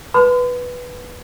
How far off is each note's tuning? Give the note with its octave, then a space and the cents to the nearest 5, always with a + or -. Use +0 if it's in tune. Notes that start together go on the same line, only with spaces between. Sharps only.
B4 +0 C6 -45